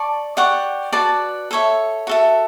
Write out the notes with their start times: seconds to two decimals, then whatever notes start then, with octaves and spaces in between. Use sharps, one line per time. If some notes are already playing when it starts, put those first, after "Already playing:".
Already playing: D5 A5 C#6
0.37 G4 D5 F#5 C#6
0.93 F#4 B4 D5 A5
1.51 A4 C#5 E5
2.07 F#4 A4 E5